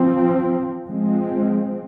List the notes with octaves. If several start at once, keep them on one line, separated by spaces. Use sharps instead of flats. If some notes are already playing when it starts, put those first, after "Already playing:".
Already playing: F3 C4
F3 G#3 C4